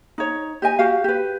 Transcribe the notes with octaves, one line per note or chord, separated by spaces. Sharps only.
D#4 C#5
G4 D#5 G#5
F#4 G4 F5
G4 B4